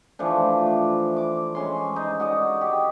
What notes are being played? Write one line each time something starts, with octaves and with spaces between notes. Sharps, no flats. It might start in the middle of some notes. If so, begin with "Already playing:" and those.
E3 F3 A3 D4
D6
G#3 C#4 C6
D#4
F#4 D5 D#5
G4